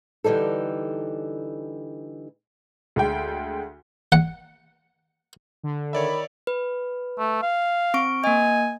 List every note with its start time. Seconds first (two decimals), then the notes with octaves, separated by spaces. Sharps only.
0.24 D3 E3 G3 D#4 A4
2.96 D2 G#3 G5
4.12 F#5
5.63 D3
5.93 D#3 C#5 D5 E5 B5
6.47 B4
7.18 A3
7.43 F5
7.94 C4 C#6 D7
8.24 A#3 D#5 G#5